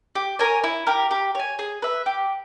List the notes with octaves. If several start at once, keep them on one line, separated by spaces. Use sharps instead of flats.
G4
A#4 C#5 G#5
E4
G4 A#4
G4
C#5 G#5
G#4
B4 E5
G4